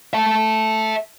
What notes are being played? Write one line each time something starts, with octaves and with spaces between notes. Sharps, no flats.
E5 A5